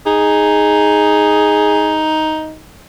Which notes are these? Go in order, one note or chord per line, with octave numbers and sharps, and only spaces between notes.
D#4 G#4